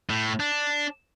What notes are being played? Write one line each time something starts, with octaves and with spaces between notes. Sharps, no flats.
A2
D4